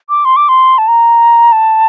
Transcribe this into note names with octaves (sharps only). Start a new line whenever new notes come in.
D6
C6
D6
C6
A5
A#5
A5